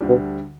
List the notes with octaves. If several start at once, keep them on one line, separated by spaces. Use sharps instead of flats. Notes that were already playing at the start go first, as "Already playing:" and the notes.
D2 D3 G3
B2